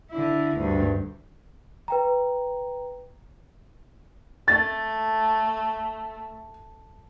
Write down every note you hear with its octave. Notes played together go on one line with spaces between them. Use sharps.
D3 E4
D2 G2
B4 G5 A#5
A3 A6